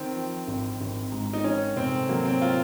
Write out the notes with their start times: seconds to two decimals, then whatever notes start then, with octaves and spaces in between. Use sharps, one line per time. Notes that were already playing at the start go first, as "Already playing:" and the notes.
Already playing: D#3 C4
0.15 F3
0.47 G#1
0.81 G#1
1.12 G#2
1.33 D#4
1.44 D#3 C#4
1.76 F1 C4
2.09 F#3 A#3
2.25 C4
2.42 F4